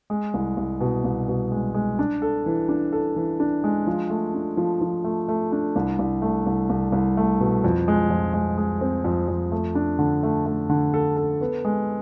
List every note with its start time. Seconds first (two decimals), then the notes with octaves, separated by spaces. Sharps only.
0.10 G#3
0.34 C2
0.57 C2
0.80 B2
1.04 C2
1.28 B2
1.52 G#3
1.74 G#3
1.99 D4
2.22 A4
2.46 E3
2.69 D4
2.93 A4
3.16 E3
3.40 D4
3.64 G#3
3.87 F3
4.10 A3
4.35 D4
4.57 F3
4.81 F3
5.04 A3
5.28 A3
5.52 D4
5.76 C2
5.99 C2
6.22 A3
6.47 C2
6.70 C2
6.93 C2
7.17 A3
7.40 B2
7.64 F2
7.88 G#3
8.10 F2
8.34 G#3
8.58 G#3
8.81 C4
9.04 F2
9.28 F2
9.52 A3
9.75 D4
9.99 D3
10.23 A3
10.46 A3
10.70 D3
10.94 A4
11.17 A4
11.41 B3
11.65 G#3